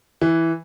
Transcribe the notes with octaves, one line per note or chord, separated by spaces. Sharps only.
E3